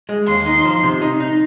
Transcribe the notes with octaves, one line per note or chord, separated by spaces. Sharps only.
G#3
D#2 C6
D#4
F3
C3
D#4
D#4